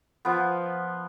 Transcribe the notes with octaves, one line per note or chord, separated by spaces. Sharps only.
F3 B3